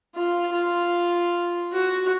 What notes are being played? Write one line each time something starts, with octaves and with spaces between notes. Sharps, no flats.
F4
F4
F#4